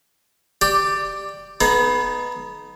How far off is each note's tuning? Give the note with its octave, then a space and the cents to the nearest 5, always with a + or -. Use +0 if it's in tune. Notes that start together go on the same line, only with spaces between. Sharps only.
G4 +0 D5 +15
B3 +0 D#4 +0 G#4 +45